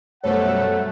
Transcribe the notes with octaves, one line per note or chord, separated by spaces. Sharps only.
F#2 B2 G3 A3 A4 C5 C#5 F#5